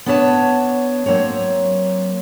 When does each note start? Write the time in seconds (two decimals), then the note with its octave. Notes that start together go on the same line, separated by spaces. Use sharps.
0.06 B3 D4 B4 C#5 D#5 A5
1.06 F#3 A#3 C4 C#5